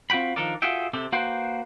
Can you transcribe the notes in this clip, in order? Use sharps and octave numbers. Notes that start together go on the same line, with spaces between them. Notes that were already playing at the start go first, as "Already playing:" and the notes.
C4 F4 F#4 G5 B5
D#3 F3 D4 A4 A#4 D5
F4 F#4 G#4 A4 E5 G5
C3 C4 G4 A4
A#3 F#4 B4 C5 G5